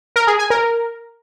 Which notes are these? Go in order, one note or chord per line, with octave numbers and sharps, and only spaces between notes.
A#4
G#4
G#5
A#4